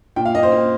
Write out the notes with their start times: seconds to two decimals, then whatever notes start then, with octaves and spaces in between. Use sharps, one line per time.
0.16 A#2 G5
0.25 F5
0.34 A#3 D#5
0.43 C5
0.52 A#3